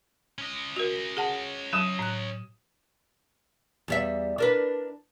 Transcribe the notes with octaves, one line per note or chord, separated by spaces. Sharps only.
C#4 D#5
F#4 A#4
G#4 F#5 A5
F#3 D#6 D#7 E7
A2 F#6
E2 G3 E5
D4 A#4 B4